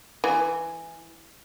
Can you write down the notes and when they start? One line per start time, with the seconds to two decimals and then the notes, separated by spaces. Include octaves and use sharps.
0.24 E3